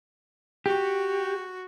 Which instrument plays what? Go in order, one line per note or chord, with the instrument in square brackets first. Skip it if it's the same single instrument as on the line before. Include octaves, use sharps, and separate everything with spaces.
[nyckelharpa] F#4 [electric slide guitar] G4